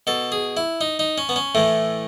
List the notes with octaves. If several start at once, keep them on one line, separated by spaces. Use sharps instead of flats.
B2 A4
G#4
E4
D#4
D#4
C#4
B3
C#4
A2 E3 A3